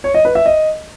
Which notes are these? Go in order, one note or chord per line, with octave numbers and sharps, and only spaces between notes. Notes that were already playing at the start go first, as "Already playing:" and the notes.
C#5
D#5
B4
E5
D#5